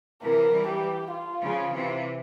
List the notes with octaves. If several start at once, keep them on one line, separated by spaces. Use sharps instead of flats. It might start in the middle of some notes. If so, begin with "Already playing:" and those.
C3 E3 A#4
E3 G3
G4
F4
C#3 F3
C3 E3